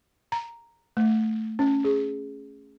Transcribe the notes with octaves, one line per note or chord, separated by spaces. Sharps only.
A#5
A3
C#4
G#4